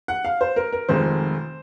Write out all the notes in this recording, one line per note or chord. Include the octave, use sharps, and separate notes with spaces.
F#5
F5
C5
A#4
A#4
F1 F2 D#3 G#3 C5